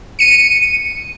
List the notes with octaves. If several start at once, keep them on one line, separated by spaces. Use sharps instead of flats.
C#7 D#7